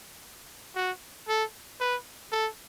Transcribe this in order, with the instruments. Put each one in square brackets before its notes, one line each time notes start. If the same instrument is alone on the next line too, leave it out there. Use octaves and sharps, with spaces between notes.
[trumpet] F#4
A4
B4
A4